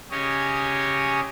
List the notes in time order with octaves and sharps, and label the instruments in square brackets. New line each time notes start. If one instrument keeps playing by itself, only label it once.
[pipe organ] C#3 G4 C#5 D#5 G#5